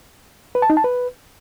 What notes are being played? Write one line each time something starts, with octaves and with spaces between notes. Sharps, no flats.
B4
A5
D#4
A5
B4